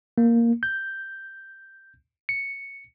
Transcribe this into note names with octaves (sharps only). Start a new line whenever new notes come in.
A#3
G6
C#7